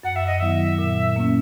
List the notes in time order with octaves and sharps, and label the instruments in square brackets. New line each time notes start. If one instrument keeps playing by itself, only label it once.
[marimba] F#2 [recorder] F#5
[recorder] E5
D#5
[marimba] D#3 F#3 B3 E4 [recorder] E5
[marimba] A#2
A#3 C#4